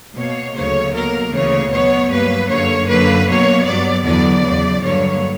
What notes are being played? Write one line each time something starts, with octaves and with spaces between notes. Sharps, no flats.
B2 A#3 C#5
D2 C#3 F#3 A#3 C#5
B2 F#3 A#3 A#4
D2 C#3 E3 A#3 C#5
B2 F#3 B3 C#5
G2 F#3 A#3 B4
F#2 D3 A#3 C#5
F#2 D3 A#3 B4
B2 F#3 A#3 C#5
G2 F#3 B3 D5
E2 D3 F#3 B3 D5
E2 C#3 F#3
G2 D3 F#3 A#3 C#5